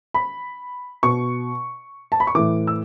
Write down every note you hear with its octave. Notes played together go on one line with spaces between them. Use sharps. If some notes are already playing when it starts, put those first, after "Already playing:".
B5
B2 C#6
A5
B5
C#6
A2 E3 D6
E6